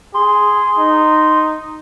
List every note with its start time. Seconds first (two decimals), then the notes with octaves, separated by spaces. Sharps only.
0.14 G#4 C6
0.79 D#4